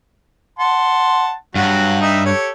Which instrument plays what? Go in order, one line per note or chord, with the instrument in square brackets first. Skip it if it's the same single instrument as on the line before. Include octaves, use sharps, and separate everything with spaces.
[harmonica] F#5 A5 C6
[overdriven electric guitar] G2 [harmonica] F#3 F#4
[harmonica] D#4 E5
G4 A4 C#5